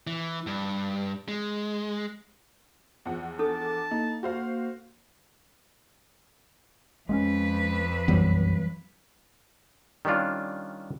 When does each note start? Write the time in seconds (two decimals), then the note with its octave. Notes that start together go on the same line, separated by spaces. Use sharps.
0.07 E3
0.47 G2
1.28 G#3
3.05 E2 F3 F#5
3.39 D4 A4 A5 D6
3.91 A#3 D#4
4.23 F#4 C5 F5
7.09 F2 G#3 A#3 C#4 B4
8.08 B1 F#2 E3 F#3 G3 B3
10.05 D#3 G3 C#4 D4 F4